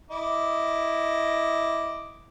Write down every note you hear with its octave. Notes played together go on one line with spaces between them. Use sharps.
E4 D#5 D6